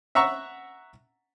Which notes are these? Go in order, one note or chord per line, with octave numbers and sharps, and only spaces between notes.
E5 F#5 A#5 C#6 E6